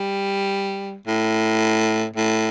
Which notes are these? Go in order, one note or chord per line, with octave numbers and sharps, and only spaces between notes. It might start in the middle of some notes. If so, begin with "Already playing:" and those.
Already playing: G3
A2
A2